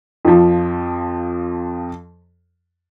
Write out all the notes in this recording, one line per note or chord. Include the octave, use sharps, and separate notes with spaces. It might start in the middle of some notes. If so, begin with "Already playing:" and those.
F2 F3